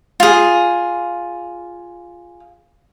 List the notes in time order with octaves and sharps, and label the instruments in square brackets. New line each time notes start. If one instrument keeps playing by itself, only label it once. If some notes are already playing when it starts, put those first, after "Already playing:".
[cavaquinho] F4 G#4